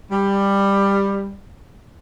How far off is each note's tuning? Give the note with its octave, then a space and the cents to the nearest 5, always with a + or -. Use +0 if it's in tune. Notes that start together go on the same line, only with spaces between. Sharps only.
G3 +15